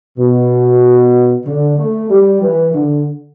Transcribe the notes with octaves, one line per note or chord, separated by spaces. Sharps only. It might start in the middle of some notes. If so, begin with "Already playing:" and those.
B2
D3
A3
G3
E3
D3